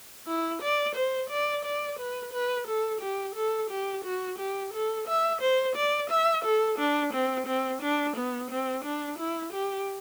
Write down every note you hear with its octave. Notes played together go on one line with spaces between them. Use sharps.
E4
D5
C5
D5
D5
B4
B4
A4
G4
A4
G4
F#4
G4
A4
E5
C5
D5
E5
A4
D4
C4
C4
D4
B3
C4
D4
E4
G4